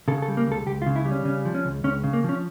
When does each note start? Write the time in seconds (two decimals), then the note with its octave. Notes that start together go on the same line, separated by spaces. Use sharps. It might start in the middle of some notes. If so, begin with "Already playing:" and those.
0.08 C#3 A4
0.22 A4
0.28 G3
0.37 A#3
0.47 C#2 A4
0.66 C#2 G4
0.82 F4
0.87 C#3
0.96 E4
1.05 G3
1.11 C#4
1.25 C#3 C#4
1.45 F3
1.54 C#4
1.65 C#2
1.84 C#2 C#4
2.04 C#3
2.13 A#3
2.24 F3 C#4